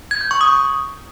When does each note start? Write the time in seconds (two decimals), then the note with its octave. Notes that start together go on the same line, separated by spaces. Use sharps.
0.11 G#6
0.21 G6
0.31 C#6
0.41 D#6